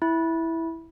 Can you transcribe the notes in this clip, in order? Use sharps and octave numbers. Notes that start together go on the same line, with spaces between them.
E4